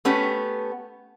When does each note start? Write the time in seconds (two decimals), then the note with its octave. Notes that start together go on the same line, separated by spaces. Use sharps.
0.05 A3 B3 C#4 G4